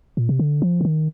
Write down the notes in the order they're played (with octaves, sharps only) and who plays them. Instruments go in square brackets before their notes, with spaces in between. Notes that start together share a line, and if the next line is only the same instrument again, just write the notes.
[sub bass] A#2
C3
D3
F3
D3
D#3